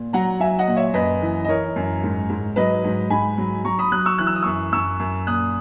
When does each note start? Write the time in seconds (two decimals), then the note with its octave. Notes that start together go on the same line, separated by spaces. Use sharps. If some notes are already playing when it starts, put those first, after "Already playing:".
Already playing: A#2
0.13 F#3 F#5 A#5
0.40 F#3 E5 G#5
0.59 D#5 F#5
0.67 A#2
0.76 C#5 E5
0.94 F#2 B4 D#5
1.22 E3
1.45 D#5
1.48 E3 A#4 C#5
1.76 F#2
2.03 G#2
2.29 G#2
2.56 F#3 B4 D#5
2.84 G#2
3.10 G#2 G#5 B5
3.38 F#3
3.64 F#3 A#5 C#6
3.79 B5 D#6
3.91 F#3 D#6 F#6
4.06 C#6 E6
4.18 E3 F#6
4.27 E6
4.35 D#6
4.43 F#2 C#6 E6
4.73 F#2 C#6 E6
5.00 F#2
5.27 A#2 D#6 F#6